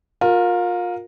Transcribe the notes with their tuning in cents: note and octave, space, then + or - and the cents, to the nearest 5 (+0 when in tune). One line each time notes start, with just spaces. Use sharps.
F4 +30 A#4 +0